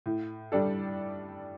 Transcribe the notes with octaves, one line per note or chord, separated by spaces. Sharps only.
A2
G3 D4 A4